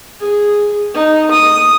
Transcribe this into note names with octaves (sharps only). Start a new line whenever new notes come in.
G#4
D#4
D#6